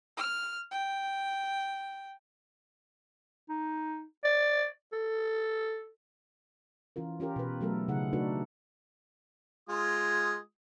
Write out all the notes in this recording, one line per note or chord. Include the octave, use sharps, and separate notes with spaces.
F6
G5
D#4
D5
A4
E3 C#4 F4 A#4
C#4 F4 G4 A#4
B2 B4
F#3 A3 A4 A#4
C#3 D#4 G#4 F#5
A3 D4 D#4 F#4 A4 B4
G#3 F4 D#6